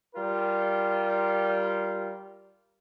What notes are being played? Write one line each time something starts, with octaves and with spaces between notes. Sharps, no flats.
G3 F4 A#4